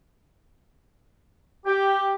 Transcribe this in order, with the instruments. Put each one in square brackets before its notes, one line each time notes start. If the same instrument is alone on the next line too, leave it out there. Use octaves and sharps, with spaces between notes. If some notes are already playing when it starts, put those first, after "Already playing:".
[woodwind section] G4